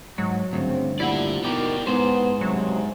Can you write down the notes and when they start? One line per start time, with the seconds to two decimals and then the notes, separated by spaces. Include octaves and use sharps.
0.18 G#2 F#3
0.53 D2 G2 C#3 F3 C4
1.00 A#2 F3 E4 G4 D5 F#5
1.45 D2 B2 G3 D#4 G4 A#4
1.87 G#2 B3 C5
2.41 G2 C3 F#3